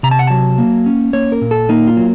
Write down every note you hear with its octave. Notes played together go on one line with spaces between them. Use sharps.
C3 A#5
A5
F#5
F#3 A5
A#3
C#4
A#3 C#5
A#4
A#2
A4
A#3 D#4
F4
F#3